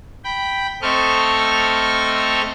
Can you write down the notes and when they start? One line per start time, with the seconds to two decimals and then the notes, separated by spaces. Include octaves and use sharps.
0.24 G5 B5
0.82 A3 C4 A4 D#5 C#6 F6